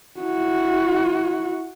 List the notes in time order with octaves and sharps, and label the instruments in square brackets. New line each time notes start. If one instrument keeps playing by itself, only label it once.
[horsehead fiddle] E4 F#4